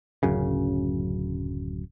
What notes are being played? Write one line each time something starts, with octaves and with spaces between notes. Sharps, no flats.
D1 F#2 C#3